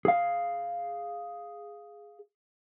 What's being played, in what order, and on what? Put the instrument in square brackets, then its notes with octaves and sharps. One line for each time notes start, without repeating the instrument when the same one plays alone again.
[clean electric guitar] G#4 F5